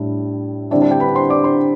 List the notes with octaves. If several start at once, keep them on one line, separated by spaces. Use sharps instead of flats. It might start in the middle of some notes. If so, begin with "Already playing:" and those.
Already playing: A2 G3 D4 E4
D3 G3 C4 D4 E4 D5
D4 D5
G4 G5
B4 B5
C5 C6
D5 D6
C5 C6